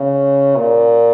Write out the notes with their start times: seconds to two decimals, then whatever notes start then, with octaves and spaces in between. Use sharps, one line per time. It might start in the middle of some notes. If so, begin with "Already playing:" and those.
Already playing: C#3
0.56 A#2